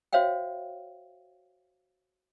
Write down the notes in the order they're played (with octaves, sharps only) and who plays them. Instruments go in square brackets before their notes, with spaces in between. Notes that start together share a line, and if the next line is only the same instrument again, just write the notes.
[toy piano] F#4 C5 C#5 E5 F5 G5